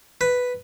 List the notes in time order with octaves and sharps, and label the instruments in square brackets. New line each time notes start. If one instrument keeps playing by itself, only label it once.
[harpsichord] B4